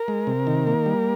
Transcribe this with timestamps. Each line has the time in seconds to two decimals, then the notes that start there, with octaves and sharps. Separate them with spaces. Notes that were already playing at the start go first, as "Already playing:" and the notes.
Already playing: A#4
0.08 G#3
0.27 C3
0.47 D#3
0.67 A#3
0.86 G3